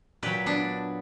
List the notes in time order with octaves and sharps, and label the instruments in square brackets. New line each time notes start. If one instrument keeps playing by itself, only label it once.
[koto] A#2 F#3 G4 B4
B3 D4